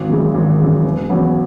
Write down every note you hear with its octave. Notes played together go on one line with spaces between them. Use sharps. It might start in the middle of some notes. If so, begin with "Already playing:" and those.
Already playing: G#1
F#2 C#3 E3 G#3
G#1
F#2 C#3 E3 G#3
E1
E2 C#3 F#3 B3